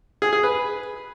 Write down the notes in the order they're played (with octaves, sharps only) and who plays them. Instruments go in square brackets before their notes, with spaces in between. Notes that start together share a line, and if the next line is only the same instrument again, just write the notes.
[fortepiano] G#4
G#4
B4